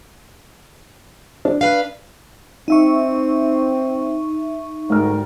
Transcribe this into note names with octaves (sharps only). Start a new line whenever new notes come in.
D4
B4 F5
C4 D#4 E5 C#6
D2 G#2 G3 A#4 F6